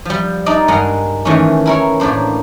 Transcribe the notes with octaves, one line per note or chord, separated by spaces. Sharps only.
F3 G3
D4 D#4 D5 D#5
G2 G#3 A#4 D#5 F#5 A#5
D#3 E3 G#3 A3 C#4
E4 A#4 C#5
A2 A#3 D4 C5